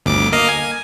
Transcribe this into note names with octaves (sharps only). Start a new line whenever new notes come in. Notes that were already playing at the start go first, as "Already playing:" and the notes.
G1 D2 D6
A#3 D#5 F5
G#5